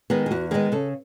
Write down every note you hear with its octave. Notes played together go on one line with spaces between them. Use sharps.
D#3 G#3 B3 G#4
G#4
E2 F#4
D#3 G#3 B3 G#4
C#3 A4